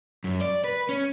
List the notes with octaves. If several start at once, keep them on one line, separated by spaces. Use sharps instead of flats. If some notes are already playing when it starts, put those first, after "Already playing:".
F#2
D5
B4
C#4